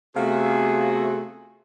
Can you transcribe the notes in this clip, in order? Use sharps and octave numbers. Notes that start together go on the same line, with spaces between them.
C3 A3 B3 F4 F#4 G#4 F5